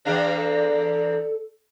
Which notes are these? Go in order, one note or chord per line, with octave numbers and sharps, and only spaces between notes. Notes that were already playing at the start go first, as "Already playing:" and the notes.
E2 A#3 D4 G#4
A4